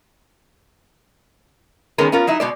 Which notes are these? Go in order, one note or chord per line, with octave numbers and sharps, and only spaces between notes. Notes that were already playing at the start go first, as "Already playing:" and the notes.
D#3 G#3 B3 C#4 G#4 A#4
B3 C#4 F4 A#4
F#3 D#4 E4
B2 G#3 D5